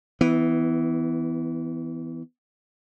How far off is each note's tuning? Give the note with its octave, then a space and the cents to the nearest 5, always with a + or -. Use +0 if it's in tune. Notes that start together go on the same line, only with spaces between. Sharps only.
E3 -10 B3 +25